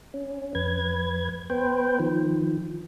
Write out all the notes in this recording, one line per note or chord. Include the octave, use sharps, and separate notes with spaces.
C#4
F2 B4 G#6
B3 B4 C5 G5
D#3 F3